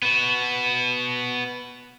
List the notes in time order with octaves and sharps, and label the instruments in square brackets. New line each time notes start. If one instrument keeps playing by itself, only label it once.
[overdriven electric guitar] B3 F#4